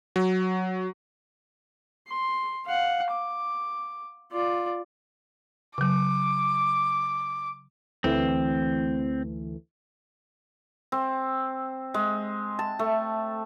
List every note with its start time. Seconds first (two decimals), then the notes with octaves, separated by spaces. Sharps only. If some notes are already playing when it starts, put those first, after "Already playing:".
0.16 F#3
2.08 C6
2.66 F5 F#5
3.11 D6
4.31 F4 D5
5.78 C#3 F#3 D6
8.04 D2 E3 A3 C4
10.92 C4
11.94 G#3
12.59 A5
12.79 A3